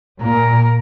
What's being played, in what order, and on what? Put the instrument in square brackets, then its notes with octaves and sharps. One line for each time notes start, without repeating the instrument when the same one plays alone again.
[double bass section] A#2 [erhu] A#4